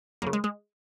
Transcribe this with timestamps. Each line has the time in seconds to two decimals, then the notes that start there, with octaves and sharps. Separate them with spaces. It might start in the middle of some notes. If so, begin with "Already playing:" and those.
0.22 F#2 C#3 A#3
0.33 G#3
0.44 G#3